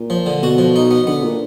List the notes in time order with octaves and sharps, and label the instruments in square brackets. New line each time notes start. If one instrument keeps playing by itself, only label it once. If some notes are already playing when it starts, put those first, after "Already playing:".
Already playing: [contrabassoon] A#2
[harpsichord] F3
D3
[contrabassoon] B2 [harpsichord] F#4
[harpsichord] F3
D#4
B3
[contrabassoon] D3 [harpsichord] B3
[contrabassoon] A#2